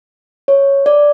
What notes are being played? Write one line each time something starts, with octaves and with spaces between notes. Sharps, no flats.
C#5
D5